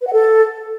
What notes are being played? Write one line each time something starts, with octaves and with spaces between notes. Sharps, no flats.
B4
F#5
A4